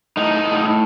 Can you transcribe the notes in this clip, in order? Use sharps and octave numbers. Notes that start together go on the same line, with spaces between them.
A2 D#4
A2